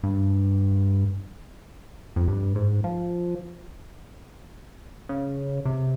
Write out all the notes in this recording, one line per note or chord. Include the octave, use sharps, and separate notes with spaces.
G2
F2
G2
G#2
F3
C#3
C3